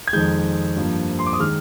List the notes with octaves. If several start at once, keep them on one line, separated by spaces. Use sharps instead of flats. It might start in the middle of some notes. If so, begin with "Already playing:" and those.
G#6
F2 D#3 G#3 G6
G2 F3 A#3
C6
D6
D#6
D#3 G#3 F6